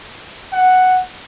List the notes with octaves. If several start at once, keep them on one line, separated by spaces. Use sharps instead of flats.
F#5